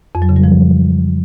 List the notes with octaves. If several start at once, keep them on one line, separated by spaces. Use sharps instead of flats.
F2
F#3
C#3
G3
F3